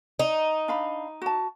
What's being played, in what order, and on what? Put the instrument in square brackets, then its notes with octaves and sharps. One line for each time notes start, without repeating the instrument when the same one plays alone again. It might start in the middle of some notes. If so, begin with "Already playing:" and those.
[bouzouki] D#4
[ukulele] D4 F5 B5
F#4 A5